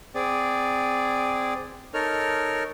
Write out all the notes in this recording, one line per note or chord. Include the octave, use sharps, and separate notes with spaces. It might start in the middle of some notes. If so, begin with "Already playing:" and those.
C4 G#4 D5
D#4 A4 A#4 C#5 F6